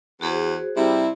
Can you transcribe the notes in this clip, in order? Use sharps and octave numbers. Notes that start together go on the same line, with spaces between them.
E2 F#4 G#4 C5
C3 G3 E4